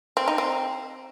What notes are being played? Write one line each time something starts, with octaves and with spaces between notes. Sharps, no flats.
C4
D#4
C4